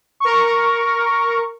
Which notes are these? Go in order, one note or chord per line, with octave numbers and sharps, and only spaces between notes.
A#4 C#6